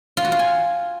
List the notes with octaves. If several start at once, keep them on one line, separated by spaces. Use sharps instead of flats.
F4
F#4
F4
G#5